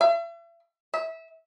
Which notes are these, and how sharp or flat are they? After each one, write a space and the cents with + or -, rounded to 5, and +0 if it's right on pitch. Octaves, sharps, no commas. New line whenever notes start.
E5 +40
E5 -20